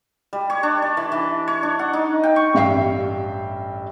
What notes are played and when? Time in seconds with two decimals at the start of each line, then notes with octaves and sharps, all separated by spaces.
0.33 G3
0.50 C#5
0.63 D4
0.82 D5
0.97 E3
1.12 E3
1.48 C#5
1.63 D4
1.79 F#5
1.93 D#4
2.23 G5
2.36 C#6
2.54 A1 G2 E5 F5 G5 C7